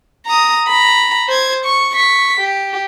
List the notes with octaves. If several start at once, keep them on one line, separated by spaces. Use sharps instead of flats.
A#5 D#6
A#5 B5
C5 G#6
C#6
C#6 B6
G4